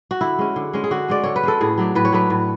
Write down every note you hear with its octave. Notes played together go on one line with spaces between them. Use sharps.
F#4
D3 E4
G#3 C#4
D3
G#3 C#4
G#4
D3 F#4
G#3 C#4 D5
D3 C#5
B4
G#3 C#4 A4
A2 G#4
F#3 A3 D4
A2 B4
C#5
F#3 A3 D4 B4
A2